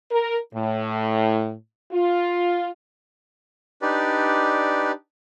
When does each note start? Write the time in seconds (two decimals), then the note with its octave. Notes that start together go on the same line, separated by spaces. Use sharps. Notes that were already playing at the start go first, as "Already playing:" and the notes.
0.12 A#4
0.54 A2
1.92 F4
3.82 D4 D#4 G4 B4 D5